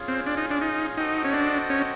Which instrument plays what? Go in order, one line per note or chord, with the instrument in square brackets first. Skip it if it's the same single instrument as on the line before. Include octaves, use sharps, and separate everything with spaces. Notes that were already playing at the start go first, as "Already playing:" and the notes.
Already playing: [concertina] C#4 F4 G#4
[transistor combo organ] C4
D4
D#4
D4
D#4
[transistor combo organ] D#4 [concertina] F#4 A4 C5 D#5 G5
[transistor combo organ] C#4
D4
C#4